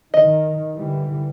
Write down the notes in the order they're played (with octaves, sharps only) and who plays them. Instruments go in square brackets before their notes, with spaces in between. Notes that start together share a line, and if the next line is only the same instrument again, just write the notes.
[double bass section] D#3 [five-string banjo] D#5
[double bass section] D3 E3 G3